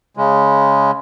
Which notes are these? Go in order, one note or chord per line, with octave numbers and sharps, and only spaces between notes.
C#3 G#3